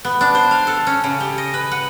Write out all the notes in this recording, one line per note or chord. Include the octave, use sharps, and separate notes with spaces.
B3
D4
C5
F5
A4
C#4
C#3
G4
D#5
B4
F#5